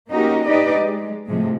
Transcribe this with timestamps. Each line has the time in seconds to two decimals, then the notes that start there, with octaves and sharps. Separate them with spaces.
0.10 A#3 C#4 D#4 F#4 G4 A#4
0.47 D4 D#4 G4 B4 D5 D#5
0.79 G#3
1.27 A2 C3 F3 G#3